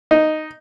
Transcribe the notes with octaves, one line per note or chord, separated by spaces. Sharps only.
D#4